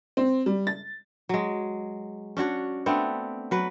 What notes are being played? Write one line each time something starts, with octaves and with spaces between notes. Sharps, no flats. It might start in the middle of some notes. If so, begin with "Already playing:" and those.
C4
G3
A6
F#3 G#3
C#4 D4 F#4 C#5
A3 B3 C4 D4
F#3 B4